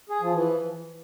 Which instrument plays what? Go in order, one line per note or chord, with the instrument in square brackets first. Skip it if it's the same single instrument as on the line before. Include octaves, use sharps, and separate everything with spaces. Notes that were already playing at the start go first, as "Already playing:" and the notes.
[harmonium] G#4
F3
E3